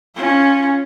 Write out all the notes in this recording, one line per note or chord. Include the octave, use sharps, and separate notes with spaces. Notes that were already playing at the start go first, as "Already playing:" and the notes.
C#4 F4